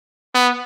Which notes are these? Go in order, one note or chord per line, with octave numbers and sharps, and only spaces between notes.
B3